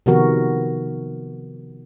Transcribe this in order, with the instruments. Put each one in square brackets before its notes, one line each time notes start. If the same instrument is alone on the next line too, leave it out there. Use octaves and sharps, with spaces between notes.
[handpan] C3 D#3 F3 B3 F#4 A#4